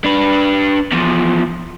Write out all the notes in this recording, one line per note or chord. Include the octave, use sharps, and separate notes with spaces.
D4 B4
E2 F3